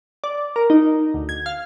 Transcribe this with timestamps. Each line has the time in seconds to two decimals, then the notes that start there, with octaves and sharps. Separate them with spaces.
0.24 D5
0.56 A#4
0.70 D#4
1.14 D2
1.29 G#6
1.46 F5